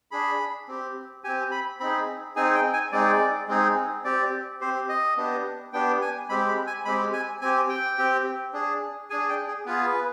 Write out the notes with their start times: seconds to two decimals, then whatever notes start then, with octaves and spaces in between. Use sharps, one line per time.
0.11 D4 G#4 B5
0.68 C4 G4
1.24 C4 G4 G#5
1.51 B5
1.80 C4 D#4 G#4 B5
2.36 C4 D#4 G#4 G#5
2.55 G5
2.73 G#5
2.92 G#3 C4 D#4 G#4 D5
3.48 G#3 C4 D#4 G#4
4.04 C4 G4 D5
4.61 C4 G4 C5
4.89 D#5
5.17 B3 D4 G4
5.73 B3 D4 G4 G5
6.02 G#5
6.29 G#3 C4 G4 B5
6.48 B5
6.67 G#5
6.85 G#3 C4 G4 B5
7.13 G#5
7.41 C4 G4 G#5
7.69 G5
7.98 C4 G4
8.53 D4 G#4
9.10 D4 G#4 G#5
9.29 G5
9.47 G#4
9.66 B3 F4 G#4 B4